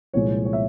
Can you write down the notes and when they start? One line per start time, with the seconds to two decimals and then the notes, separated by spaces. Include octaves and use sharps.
0.14 C2 A#2 F3 G#3 C#5
0.45 C#5
0.53 E5